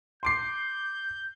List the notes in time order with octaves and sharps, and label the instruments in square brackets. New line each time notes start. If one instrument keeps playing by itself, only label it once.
[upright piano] C6 D6 C7 [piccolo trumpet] G6